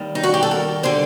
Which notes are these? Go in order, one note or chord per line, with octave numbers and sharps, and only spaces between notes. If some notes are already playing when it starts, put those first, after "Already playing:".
Already playing: D#2 D#3 G3
D#4
F#4
G4
A4
A#4
D3 G3 C5